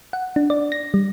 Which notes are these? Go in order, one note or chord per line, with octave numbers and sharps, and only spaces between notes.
F#5
D4
D5
A#6
G3